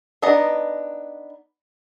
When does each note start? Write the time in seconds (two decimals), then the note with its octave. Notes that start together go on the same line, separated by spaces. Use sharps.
0.22 B3 D4 D#4 D#5 A#5